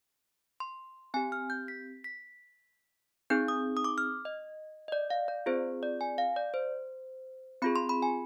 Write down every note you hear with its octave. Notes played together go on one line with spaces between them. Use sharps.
C6
C4 G4 G#5
F6
G6
B6
B6
C4 D#4 G#4 G6
D#6
D#6
D6
F6
D#5
D#5
D5
F5
D5
C4 F4 G#4 C5
D5
G#5
F5
D5
C5
C4 F4 G#4 B5
C6
B5
G#5